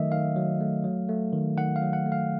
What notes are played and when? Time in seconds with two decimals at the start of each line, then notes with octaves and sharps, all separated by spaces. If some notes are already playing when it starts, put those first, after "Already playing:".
Already playing: D#3 F#3 A3 D#5 E5
0.12 D#3 F5
0.36 F#3
0.61 A3
0.84 F#3
1.09 A3
1.32 D#3
1.57 D#3 F#5
1.76 F5
1.82 F#3
1.93 F#5
2.06 A3
2.12 F5